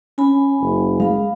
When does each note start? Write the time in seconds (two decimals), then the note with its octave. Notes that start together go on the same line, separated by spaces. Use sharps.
0.18 C#4 G#5 B5
0.61 F#1
1.00 G#3 F5 B5